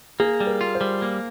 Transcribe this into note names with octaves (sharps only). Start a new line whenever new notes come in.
A#3 G#4
G3
A#4
F4
C5
G3
A#3